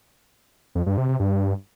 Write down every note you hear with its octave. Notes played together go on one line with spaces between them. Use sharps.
F2
G2
C3
C3
G2